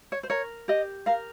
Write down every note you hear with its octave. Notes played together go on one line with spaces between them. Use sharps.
C#5
C5
A#4 C#5
G4 D#5
A#4 F5